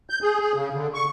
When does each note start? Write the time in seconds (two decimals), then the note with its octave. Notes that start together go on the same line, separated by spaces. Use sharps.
0.10 G6
0.22 G#4
0.40 G#4
0.54 C#3
0.73 D3
0.94 C#6